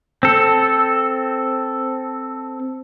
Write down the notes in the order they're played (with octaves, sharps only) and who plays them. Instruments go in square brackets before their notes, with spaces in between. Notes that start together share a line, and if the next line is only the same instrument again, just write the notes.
[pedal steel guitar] C4 A4